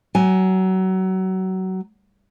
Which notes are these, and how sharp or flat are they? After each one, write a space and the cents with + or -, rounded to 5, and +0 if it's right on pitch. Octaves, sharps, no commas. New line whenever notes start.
F#3 +25 G#5 +0